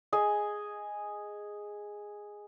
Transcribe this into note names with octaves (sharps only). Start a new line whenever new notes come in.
G#4 D#5 G#5